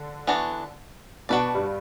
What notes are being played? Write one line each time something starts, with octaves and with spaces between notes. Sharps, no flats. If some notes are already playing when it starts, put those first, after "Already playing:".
Already playing: D3
E3 B3 D4 F#4
B2 B3 D4 F#4 B4 D5
G2 G3